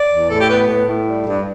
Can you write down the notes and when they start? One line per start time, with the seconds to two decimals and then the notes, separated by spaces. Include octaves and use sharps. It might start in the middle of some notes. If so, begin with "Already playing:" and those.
Already playing: D5
0.09 E2
0.28 A2 A4
0.38 G4
0.48 B3 B4
0.67 A2
0.86 A2
1.06 G3
1.25 G2